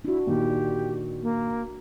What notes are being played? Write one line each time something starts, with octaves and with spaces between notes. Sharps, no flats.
D4 E4 F#4
A#2 D#3 G4
A#3